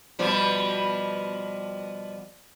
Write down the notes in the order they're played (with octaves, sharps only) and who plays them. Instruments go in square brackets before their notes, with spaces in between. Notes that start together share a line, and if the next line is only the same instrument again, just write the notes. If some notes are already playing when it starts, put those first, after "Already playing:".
[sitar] B2 F3 G3